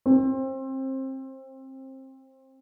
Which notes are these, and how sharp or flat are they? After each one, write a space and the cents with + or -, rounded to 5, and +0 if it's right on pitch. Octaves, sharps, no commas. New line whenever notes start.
C4 +25